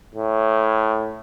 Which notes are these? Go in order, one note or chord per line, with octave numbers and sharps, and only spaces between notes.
A2